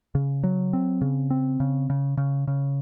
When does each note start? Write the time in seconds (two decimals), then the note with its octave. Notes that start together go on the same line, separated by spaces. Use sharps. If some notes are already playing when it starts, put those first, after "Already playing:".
0.15 C#3
0.43 F#3
0.73 C4
1.01 C#3
1.30 C4
1.60 C#3
1.90 C#3
2.17 C#3
2.47 C#3